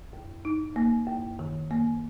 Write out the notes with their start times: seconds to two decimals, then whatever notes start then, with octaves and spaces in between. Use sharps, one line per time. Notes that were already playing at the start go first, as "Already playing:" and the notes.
0.13 F#2
0.45 D#4
0.76 A#3
1.07 F#2
1.39 D#3
1.71 A#3